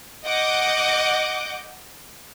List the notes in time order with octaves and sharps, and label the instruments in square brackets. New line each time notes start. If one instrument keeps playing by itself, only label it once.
[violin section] D#5 F#5 D6 G6